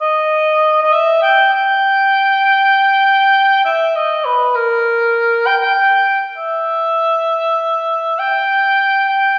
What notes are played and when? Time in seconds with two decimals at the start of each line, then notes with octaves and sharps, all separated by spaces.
0.02 D#5
0.83 D#5
0.92 E5
1.22 G5
1.53 G5
3.65 E5
3.95 D#5
4.25 B4
4.55 A#4
5.46 G5
5.62 G5
6.37 E5
8.19 G5
9.09 G5